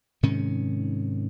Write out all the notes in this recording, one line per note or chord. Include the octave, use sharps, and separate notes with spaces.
G#2 C3 D#3 C#4